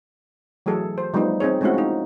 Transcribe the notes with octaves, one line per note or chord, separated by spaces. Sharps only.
E3 F#3 A3 G#4 A4
C5
F3 G3 A3 B3 D#4
C4 D#4 G#4 C#5
G#3 A3 C4 C#4 E4 F#4
D#4 F4